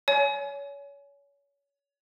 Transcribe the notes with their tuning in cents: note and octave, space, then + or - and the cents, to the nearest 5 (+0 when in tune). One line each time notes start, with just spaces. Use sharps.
C#5 +30 G#5 +25